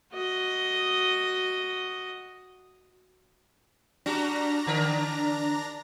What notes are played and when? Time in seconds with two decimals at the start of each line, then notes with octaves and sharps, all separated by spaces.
0.12 F#4 D#5
4.06 G3 D4 F#4 A#5 A#6
4.67 D3 A#4